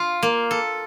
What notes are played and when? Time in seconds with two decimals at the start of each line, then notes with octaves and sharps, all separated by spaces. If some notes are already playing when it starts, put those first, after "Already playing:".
Already playing: F4
0.23 A#3
0.51 A4